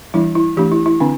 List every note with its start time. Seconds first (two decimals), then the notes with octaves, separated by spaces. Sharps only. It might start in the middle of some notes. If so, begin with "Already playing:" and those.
0.14 E3 G3 D4 E4
0.35 E4
0.57 E3 A3 D4 G4
0.72 E4
0.86 E4
1.00 D3 C4 D4